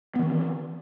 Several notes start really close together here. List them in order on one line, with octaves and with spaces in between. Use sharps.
B3 E3 D#3 C4